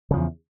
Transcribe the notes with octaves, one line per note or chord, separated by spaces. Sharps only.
E2 C#3 F3